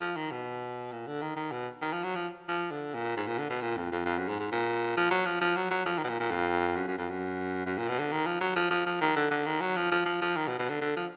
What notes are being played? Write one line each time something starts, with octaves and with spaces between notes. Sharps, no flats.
F3
D#3
B2
A#2
D3
D#3
D#3
B2
D#3
F3
F#3
F3
F3
D3
A#2
G#2
A#2
D3
B2
A#2
F2
F2
F2
F#2
G#2
G#2
A#2
F3
F#3
F3
F3
F#3
F#3
F3
D#3
B2
A#2
A#2
F2
F#2
F#2
F2
F#2
F#2
A#2
B2
D3
D#3
F3
F#3
F3
F3
F3
D#3
D3
D3
D#3
F#3
F3
F3
F3
F3
D#3
B2
B2
D3
D3
F3